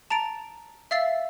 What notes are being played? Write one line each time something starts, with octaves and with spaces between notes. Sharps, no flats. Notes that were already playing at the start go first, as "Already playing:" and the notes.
A5 A#5 A6 D7
E5 F5 E6 A6 C7